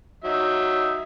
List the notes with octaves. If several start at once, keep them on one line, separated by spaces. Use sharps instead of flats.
F#3 D#4 E5